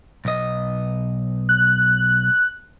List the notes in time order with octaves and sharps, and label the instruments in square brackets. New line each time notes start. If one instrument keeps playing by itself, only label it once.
[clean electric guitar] B1 D#5
[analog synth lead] F#6